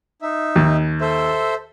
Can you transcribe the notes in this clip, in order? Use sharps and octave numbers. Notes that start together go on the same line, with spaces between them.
D#4 E5
D#2
A4 C5 E5